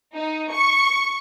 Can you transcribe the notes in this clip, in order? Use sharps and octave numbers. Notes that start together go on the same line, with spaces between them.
D#4
C#6